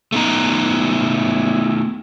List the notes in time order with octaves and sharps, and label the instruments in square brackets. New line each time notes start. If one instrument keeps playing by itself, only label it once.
[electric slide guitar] A3 B3 D#4 A#5